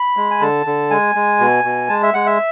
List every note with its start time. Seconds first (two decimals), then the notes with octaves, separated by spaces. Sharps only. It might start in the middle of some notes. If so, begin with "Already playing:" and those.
Already playing: B5
0.17 G#3
0.31 G#5
0.41 D3 A5
0.66 D3
0.90 G#3 G#5
1.15 G#3
1.40 B2
1.64 B2
1.89 G#3 A5
2.03 E5
2.14 G#3 F#5
2.26 E5